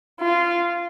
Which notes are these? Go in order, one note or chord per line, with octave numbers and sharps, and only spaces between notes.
F4